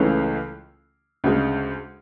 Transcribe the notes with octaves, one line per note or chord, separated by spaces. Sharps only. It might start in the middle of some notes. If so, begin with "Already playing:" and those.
Already playing: C#2 C#3 E3 A3 C#4
D2 C#3 G#3